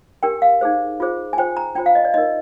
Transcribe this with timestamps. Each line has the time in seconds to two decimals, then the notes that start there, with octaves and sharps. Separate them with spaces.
0.23 D4 G4 A#4 G5
0.42 F5
0.61 D#4 G#4 C5
1.00 F4 G#4 C5
1.33 G#5
1.37 F4 C5 G5
1.57 A#5
1.75 D4 F4 C5 G5
1.86 F5
1.95 D#5
2.05 D5
2.14 D#4 A#4 D#5